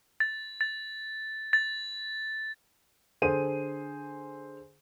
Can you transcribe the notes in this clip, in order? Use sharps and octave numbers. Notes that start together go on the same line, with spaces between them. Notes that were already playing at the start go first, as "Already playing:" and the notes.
A6
A6
A6
D3 G#4 A4 C5 D#7